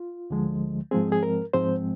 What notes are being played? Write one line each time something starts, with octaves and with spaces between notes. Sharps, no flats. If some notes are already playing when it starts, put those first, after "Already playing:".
Already playing: F4
D2 D3 F3 G#3
G#2 F3 G#3 C4 G#4
G#4
A#4
G#2 F3 G#3 C4 C5